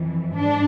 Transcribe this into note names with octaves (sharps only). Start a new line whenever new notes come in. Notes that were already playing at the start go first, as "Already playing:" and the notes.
Already playing: F2 E3
G#2 D4